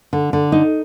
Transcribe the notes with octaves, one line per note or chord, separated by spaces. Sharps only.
D3
D3
D#4